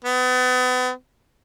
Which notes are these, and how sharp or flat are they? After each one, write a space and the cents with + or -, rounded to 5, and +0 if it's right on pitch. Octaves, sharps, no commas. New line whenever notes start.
B3 +35